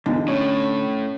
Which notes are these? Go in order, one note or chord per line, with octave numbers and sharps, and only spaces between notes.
B1 E2 D3
A2 C#4